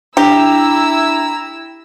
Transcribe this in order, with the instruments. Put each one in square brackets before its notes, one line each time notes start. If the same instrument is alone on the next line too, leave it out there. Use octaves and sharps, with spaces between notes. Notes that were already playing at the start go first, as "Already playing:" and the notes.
[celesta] D4 [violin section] E4 E6 [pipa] G4 [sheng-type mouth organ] A#5